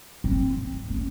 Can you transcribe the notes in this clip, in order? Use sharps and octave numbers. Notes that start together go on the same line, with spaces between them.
C4
C#4